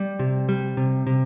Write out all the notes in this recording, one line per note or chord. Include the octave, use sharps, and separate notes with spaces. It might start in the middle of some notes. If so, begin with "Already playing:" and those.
Already playing: G3
C3
G3
C3
C3